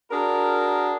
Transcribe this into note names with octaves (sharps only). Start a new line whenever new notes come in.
D4 F#4 G#4 A#4